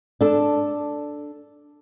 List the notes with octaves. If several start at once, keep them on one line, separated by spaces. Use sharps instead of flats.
D4 A4